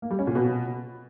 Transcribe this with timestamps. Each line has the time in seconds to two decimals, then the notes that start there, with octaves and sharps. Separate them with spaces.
0.02 A#3
0.11 G3
0.19 C#4
0.27 A#2
0.35 B2